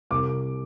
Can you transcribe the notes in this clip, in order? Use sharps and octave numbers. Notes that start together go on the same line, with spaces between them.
C2 D6